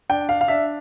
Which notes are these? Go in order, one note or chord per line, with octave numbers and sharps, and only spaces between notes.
D4 G5
F5
F5
D4 E5